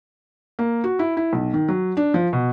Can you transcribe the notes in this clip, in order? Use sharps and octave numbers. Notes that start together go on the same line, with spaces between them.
A#3
F#4
E4
E4
B1
D#3
F#3
D4
F3
B2